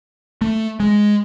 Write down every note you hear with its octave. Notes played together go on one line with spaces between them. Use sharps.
A3
G#3